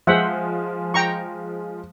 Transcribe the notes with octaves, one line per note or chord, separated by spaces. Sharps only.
F3 G#3 C5 E5 F#5
G5 A#5 C#6